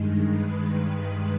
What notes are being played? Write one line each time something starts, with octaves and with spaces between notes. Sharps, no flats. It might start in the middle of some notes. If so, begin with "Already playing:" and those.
Already playing: G2 D#3 G#3
B4